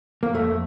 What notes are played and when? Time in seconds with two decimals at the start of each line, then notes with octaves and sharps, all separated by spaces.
0.23 A#3
0.33 F2 A3